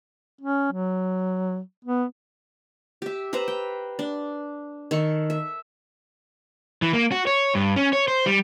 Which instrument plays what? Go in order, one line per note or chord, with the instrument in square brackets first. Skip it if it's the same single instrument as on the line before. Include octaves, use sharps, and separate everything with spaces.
[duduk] C#4
F#3
B3
[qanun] G4 E5
B4 C5 E5 A#5
G5
D4
D#3 A4 C#6
E5
[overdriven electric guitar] E3
A#3
F#4
C#5
G2
C#4
C#5
C5
G3